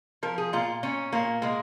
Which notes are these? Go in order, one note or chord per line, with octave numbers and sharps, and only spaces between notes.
F3 A#4
G#4
A#2 F4
A#2 C#4
A#2 A#3
G#3 A#3